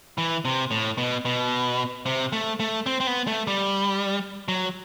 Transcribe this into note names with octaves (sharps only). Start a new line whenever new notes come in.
E3
C3
A2
B2
B2
C3
A3
A3
C4
C4
B3
A3
G3
F#3